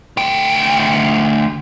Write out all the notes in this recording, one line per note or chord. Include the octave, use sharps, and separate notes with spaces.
D2 G5